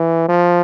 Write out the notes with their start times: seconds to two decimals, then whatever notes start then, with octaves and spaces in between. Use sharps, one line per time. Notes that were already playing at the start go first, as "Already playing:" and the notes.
Already playing: E3
0.28 F3